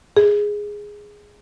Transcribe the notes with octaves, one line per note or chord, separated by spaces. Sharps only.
G#4